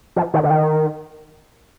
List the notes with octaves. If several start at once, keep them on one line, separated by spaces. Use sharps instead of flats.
F3
D#3
D3
D#3